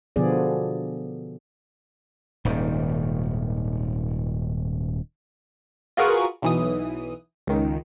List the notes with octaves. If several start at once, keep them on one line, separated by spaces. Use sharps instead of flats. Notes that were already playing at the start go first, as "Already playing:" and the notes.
B2 D3 F3 B3 G#4 D5
D#1 G#2 D#3
F4 F#4 G#4 A#4 B4 C#6
B1 E3 D#6
C#2 D#3